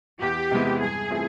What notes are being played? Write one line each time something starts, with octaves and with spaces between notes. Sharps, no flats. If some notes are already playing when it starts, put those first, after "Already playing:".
E2 G4
C3 E3 G#3 B3
G2 G#4
E3 A3 C4 F4